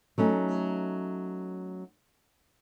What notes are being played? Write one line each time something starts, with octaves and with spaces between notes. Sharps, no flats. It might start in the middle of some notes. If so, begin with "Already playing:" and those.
F#3 A3 C#4 D#4